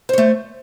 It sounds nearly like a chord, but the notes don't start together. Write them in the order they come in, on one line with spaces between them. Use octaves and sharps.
C5 C#5 A3